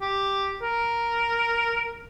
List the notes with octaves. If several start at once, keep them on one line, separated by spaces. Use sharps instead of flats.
G4
A#4